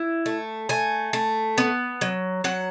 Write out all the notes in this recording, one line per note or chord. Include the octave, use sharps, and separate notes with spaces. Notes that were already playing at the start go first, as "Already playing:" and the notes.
Already playing: E4
A3
A3 G#5
A3
B3
F#3
F#3 F#5